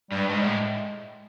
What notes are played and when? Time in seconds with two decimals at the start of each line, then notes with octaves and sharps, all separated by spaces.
0.11 G2 G3
0.29 G#2 G#3
0.43 A2